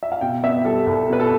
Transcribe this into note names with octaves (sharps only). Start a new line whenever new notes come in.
E5
F5
B2 G5
B3 E5
G3 A4
C2
B2 B4
A4